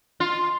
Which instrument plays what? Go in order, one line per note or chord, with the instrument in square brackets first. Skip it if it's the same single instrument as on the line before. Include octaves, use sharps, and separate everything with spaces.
[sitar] F4